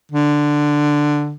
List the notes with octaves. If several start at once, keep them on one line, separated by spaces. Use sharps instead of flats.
D3